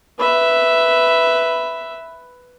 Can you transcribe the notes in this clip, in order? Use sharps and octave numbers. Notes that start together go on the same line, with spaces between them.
B4 E5